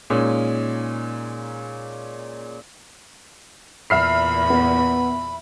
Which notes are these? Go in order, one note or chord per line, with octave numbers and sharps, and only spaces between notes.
A#2 G#3 C#4 D#4
E2 A#2 E5 B5 F6 C7
B3